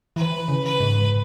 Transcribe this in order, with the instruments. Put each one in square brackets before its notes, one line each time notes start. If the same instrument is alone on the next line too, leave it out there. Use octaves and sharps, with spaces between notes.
[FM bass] E3 [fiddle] B4
[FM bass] C#3
[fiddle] B4
[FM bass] G#2